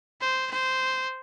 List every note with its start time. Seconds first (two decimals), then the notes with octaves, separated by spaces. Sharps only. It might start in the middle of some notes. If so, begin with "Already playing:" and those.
0.21 C5
0.51 C5